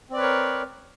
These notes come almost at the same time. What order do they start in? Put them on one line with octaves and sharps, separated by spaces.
C4 D5 B4 C#5 A#4